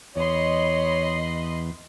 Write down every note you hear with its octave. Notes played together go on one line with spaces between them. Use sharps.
E2 C#5 D#5 B5 C6